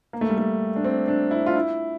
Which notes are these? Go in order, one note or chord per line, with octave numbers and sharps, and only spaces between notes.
A#3
A3
G3
A3
D4
C4
D4
E4
F4
E4